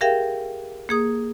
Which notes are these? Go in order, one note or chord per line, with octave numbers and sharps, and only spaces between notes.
G4 G#4 A#4 E5 F5 G5
A#3 G#4 D#6